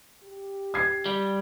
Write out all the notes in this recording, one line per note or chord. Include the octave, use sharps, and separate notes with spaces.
G4
G#6 C7
G3